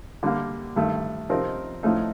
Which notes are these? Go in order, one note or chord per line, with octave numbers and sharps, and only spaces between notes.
D3 G3 A#3
G2 D#3 A3
C3 F3 C4 D#4 A#4
A2 F3 A3 D#4